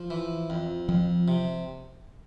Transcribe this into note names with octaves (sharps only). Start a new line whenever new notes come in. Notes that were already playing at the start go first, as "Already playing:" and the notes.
Already playing: F3
E3
F2
F2 F3
C3